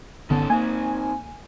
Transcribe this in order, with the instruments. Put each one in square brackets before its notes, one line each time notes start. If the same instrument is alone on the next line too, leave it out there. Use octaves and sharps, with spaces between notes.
[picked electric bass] G1 D3 B3 [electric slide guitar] D#3 C#4 A4
[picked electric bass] A#3 [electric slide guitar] C4 D#4 [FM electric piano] G#5